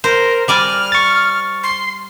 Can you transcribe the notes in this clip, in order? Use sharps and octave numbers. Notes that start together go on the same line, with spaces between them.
A#4 C5
G3 D5 G#5 F6
C#6 A6
C6